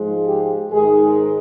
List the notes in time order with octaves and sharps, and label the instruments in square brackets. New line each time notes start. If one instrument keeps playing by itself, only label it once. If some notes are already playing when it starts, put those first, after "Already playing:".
Already playing: [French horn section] G#2 F3 G#3
G4
G#2 D#3 G#3 G#4